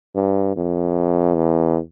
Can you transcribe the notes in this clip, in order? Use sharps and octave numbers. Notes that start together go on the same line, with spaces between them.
G2
F2
E2